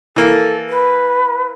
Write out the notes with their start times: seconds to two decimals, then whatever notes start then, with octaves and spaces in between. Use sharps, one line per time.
0.16 E3 A#3 A4
0.69 B4